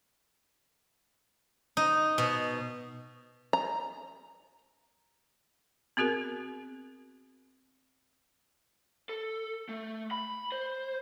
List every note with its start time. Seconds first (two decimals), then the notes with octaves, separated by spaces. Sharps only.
1.77 D#4
2.18 B2
3.53 A#5
5.97 B3 C4 F#4 G#4 A#4
9.09 A4
9.69 A3
10.11 B5
10.52 C5